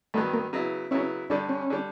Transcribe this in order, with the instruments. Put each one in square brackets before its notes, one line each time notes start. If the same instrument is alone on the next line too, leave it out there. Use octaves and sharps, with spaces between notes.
[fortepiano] G2 D#3 F#3 B3 [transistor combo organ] A3
[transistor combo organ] A#3
[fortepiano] C#3 F#3 B3 E4
[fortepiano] C#3 F#3 B3 E4 [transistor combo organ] C#4
[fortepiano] G2 D3 G3 [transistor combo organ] D4
[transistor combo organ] C#4
[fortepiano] D3 G3